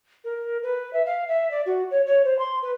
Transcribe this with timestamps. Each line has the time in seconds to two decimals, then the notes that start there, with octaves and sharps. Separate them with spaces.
0.24 A#4
0.63 B4
0.93 E5
1.06 F5
1.28 E5
1.51 D5
1.66 F#4
1.91 C#5
2.06 C#5
2.24 C5
2.39 C6
2.62 B4